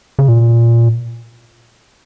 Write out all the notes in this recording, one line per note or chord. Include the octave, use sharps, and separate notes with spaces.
C#3
A#2